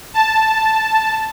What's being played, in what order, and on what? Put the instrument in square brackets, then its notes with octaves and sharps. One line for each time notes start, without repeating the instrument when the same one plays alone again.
[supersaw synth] A5